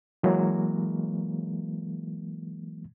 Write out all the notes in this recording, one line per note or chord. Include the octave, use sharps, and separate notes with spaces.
E3 F#3 G#3 A#3